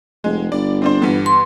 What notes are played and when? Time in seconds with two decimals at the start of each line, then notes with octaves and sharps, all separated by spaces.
0.24 F1 G#3
0.52 G1 D5
0.82 C4 D4 C5
1.02 G2 E3 B3
1.26 C6